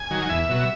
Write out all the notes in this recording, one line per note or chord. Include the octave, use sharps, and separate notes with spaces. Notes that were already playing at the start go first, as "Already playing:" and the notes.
Already playing: G#5
D#3 F#3
E2 E5
B2 F#3